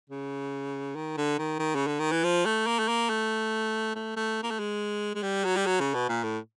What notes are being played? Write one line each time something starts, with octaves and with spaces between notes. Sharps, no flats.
C#3
D#3
D3
D#3
D#3
C#3
D3
D#3
E3
F3
A3
A#3
A3
A#3
A3
A3
A3
A#3
A3
G#3
G#3
G3
F#3
G3
F#3
C#3
B2
A#2
A2